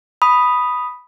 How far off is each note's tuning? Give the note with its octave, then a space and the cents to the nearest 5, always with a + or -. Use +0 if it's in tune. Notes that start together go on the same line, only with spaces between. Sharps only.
B5 +0 D#6 +0